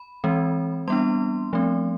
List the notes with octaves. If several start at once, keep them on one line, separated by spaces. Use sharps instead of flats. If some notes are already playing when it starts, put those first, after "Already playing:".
Already playing: B5
E3 G#3 C4
G3 B3 D4 C6
F3 A3 C4